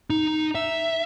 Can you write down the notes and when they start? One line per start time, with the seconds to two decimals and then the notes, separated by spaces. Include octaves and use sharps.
0.10 D#4
0.55 E5